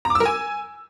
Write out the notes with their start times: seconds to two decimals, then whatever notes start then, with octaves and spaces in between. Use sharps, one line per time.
0.05 A#5
0.10 D6
0.15 E6
0.20 A#4
0.25 G#5